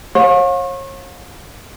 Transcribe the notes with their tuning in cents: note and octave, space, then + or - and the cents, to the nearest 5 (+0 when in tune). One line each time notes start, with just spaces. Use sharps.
C#5 -35 F5 +35 G#5 +0